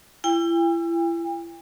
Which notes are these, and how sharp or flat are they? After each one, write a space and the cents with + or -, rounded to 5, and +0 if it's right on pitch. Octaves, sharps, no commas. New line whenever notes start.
E4 +35 G5 +45